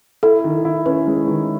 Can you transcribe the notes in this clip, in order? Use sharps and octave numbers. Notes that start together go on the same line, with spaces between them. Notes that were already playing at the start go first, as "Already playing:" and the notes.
E4 A4
D#3
E4
C#4 B4
G#3
D#3